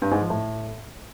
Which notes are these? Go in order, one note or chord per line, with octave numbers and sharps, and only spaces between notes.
G2
G#2
F3
A2